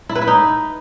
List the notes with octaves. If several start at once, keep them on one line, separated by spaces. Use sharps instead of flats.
E4
B4
E4
D#4